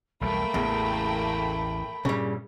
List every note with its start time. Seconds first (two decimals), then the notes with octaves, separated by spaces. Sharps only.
0.21 B1 E2 G3 A3 A#3 G5 B5
0.54 A1 E2 A2 C#3
2.05 G2 A#2 C#3 G3